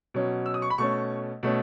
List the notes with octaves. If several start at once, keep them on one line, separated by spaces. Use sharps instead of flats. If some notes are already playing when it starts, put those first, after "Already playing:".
B2 F#3 C#4
E6
D#6
C#6
B5
B2 A3 C#4 C#6
B2 A3 C#4